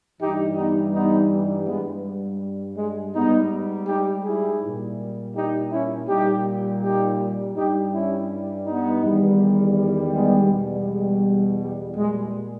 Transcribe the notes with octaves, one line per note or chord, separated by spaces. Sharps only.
G2 E3 G3 D#4 G4
B3 D#4
B3 D#4
G2 G3 G#3 B3
G#3
G#2 G3 B3 D#4
D#4 G4
E4 G#4
A#2 G3
D#4 G4
C#4 E4
A#2 G3 D#4 G4
D#4 G4
G2 G3 D#4 G4
C#4 E4
B3 D#4
E2 D#3 G3
G#3 B3
E2 B2 G3
G#3
G3
A#2 G3 G#3